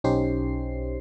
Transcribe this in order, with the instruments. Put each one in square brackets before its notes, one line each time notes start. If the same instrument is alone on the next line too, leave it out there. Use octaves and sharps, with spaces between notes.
[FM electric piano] B1 C#4 D#4 G4 C5 C7